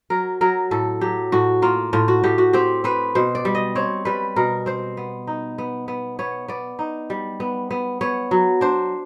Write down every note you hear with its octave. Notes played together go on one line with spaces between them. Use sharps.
F#3 A#4
F#3 A#4
A2 A4
F#3 G4
A2 F#4
A#3 F4
A2 F4
F#4
A2 G4
F#4
C4 G4
C4 B4
B2 C5
D5
G3
D#5
C4 C#5
G3 B4
B2 A#4
C4 C5
B3
D#4
B3
B3
B3 C#5
B3 D5
D#4
G3
B3
B3
B3 C#5
F#3
D4 C5